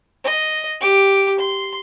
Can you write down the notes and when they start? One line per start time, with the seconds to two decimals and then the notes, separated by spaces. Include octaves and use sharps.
0.24 D#5
0.80 G4 D6
1.39 C6